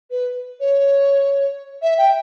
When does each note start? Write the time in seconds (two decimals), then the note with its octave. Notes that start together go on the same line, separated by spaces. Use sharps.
0.11 B4
0.60 C#5
1.82 E5
1.98 G5